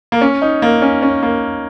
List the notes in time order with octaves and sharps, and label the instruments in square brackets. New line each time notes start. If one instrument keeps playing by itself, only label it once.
[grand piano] A#3
C#4
D#4
A#3
C#4
C#4
A#3